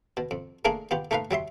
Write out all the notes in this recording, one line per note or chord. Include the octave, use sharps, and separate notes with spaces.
B2
F2
A3 A#3 D4 G#4 A#4
B3 F4 G4
A3 D#4 A#4 B4 F5
F#3 G3 E5 C6